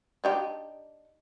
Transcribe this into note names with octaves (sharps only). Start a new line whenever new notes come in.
D4 D#4 G4